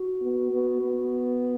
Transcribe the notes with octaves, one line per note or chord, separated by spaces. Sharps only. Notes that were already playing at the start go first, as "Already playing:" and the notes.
Already playing: F#4
B3
B3
B3